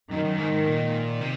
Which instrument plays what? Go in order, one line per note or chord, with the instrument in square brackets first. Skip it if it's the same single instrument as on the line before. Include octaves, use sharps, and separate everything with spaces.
[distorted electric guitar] F#2 [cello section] D#3
[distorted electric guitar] F#2
G#2
G#2
A#2
C3